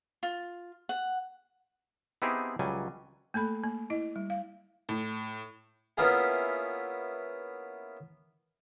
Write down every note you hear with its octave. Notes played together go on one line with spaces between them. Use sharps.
F4
F#5
B3 C4 D#4 E4 G4 G#4
C#2 F#3 G3 G#5
A3 A#3 A4 B5
A#3
E4 D#5
G3
F5
A2
A#3 B3 C#4 E4 F4 G#4